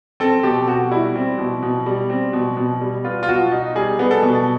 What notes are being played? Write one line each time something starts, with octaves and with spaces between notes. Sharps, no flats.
C4 A4
B2 G4
B2 F#4
G3 E4
C4
B2
B2
G3
C4
B2
B2
G3
B3 F4
F4
B2 F#4
D#4
G3 G#4
B3
A4
B2